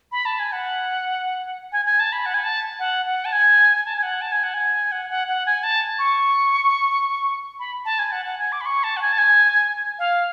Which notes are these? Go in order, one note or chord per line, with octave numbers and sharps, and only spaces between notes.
B5
A5
G#5
F#5
G#5
G#5
A5
B5
F#5
G#5
A5
F#5
F#5
A5
G#5
A5
G#5
F#5
A5
G#5
F#5
G#5
F#5
F#5
F#5
G#5
A5
C#6
B5
A5
G#5
F#5
F#5
G#5
D6
B5
C#6
A5
F#5
G#5
A5
G#5
F5